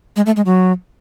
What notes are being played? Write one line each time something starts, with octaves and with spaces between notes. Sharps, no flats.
G#3
A3
G#3
F#3